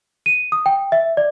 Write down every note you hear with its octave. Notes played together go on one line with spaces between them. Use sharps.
D#7
D#6
G5
E5
D5